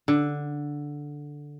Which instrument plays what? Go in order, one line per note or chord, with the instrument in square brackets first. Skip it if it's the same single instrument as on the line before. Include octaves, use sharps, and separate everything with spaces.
[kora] D3